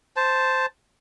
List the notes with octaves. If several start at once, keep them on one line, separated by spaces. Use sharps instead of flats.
C5 A5